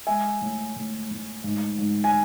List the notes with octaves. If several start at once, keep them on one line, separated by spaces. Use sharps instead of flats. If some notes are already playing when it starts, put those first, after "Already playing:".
G#3 E5 G#5
A2
A2
A2
G#2
G#2
G#5